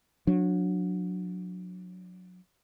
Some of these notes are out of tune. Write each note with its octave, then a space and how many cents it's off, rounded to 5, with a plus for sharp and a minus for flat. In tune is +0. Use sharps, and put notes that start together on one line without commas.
F#3 -30 D4 +0